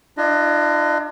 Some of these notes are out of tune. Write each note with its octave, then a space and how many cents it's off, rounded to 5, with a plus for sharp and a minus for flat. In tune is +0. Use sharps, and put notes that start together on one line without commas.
D4 +30 F4 -45 D#5 +0